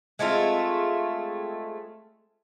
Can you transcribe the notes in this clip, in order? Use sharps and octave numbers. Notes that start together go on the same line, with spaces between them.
G#3 A3 C4 F4